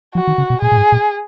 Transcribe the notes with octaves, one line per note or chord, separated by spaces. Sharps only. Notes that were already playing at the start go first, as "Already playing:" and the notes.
F3 F#4
D#3
C#3
B2
A#2 G#4
A#2
G#2
A#2